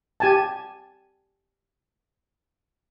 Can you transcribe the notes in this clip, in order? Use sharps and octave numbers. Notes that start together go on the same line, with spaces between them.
G4 G#5 A5